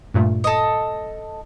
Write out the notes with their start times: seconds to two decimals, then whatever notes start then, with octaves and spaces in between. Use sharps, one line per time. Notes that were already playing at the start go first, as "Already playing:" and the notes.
0.14 G2 A#2 A3
0.44 A4 D#5